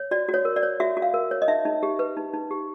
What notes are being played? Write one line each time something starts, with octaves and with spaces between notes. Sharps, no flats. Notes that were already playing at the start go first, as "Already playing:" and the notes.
Already playing: C#5
F#4 D5
F#4
C#5
A#4
D5
C#5
F#4 E5
F#4
F5
A#4
C#5
D#5
D#4 E5
D#4
G4
B4
D#4
D#4
G4